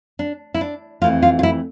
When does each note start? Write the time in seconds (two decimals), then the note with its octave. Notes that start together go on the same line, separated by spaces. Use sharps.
0.19 D4
0.54 E4
0.61 D4
1.02 F2 E3 A3 F4
1.22 F4
1.39 F4
1.43 E4